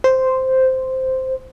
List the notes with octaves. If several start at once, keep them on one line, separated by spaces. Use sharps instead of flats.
C5